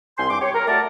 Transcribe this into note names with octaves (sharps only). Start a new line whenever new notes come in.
C2 G#5 C6
G2 D6
G4 C#5
A#4
A3 F#4 A#4 D5 A5